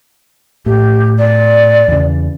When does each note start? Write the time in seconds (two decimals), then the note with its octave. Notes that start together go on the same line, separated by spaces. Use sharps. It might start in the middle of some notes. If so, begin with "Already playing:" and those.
0.66 A2 G4
1.19 D5
1.88 E2 C#3